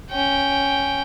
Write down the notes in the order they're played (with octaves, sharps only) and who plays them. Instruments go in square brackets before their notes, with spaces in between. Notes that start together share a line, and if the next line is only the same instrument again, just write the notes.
[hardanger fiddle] C#4 G5